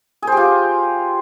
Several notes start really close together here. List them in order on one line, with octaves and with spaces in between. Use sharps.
G#4 C5 G4 F4